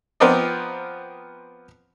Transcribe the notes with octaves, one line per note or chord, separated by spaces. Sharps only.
F3 B3 C4 A#4 D5 D#5